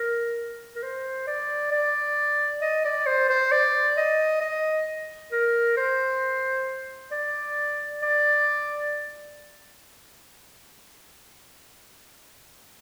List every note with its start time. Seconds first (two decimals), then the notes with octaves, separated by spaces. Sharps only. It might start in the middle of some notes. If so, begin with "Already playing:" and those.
Already playing: A#4
0.76 A#4
0.83 C5
1.28 D5
1.72 D5
2.62 D#5
2.85 D5
3.06 C5
3.29 C5
3.52 D5
3.98 D#5
4.41 D#5
5.32 A#4
5.77 C5
7.11 D5
8.02 D5